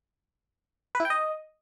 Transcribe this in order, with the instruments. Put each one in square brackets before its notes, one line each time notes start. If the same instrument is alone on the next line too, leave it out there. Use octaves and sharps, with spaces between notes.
[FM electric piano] B4
E4
G5
D#5